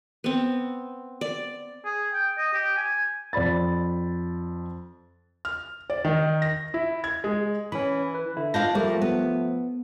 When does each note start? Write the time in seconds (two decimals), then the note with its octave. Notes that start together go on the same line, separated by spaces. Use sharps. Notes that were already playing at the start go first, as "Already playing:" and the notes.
0.24 B3 C4
1.21 D5
1.85 G#4
2.13 G5
2.37 D#5
2.53 G4
2.76 G#5
3.33 F2 D5 B5 A6
5.45 F6
5.90 D5
6.05 D#3
6.42 A#6
6.74 E4
7.04 G#6
7.24 G#3
7.72 E3 C#4 B5
8.15 B4
8.37 D3 E4
8.54 D4 F4 F5 G6 A#6
8.75 F3 G3 A3 A#3
9.02 B3